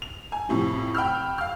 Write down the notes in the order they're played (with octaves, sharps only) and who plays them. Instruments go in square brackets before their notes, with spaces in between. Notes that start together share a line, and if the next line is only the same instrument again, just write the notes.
[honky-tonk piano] F7
G#5
F2 A2 C3
G5 B5 E6 F6
F5 F6